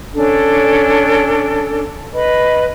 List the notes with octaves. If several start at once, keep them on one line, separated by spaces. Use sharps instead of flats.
C#4 D4 A4
B4 D#5 B5